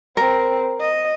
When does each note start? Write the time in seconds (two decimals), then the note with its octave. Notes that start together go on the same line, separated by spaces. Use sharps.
0.17 C4 A#4
0.80 D#5